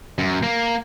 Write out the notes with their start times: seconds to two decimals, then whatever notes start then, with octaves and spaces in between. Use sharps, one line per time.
0.19 F#2
0.43 A#3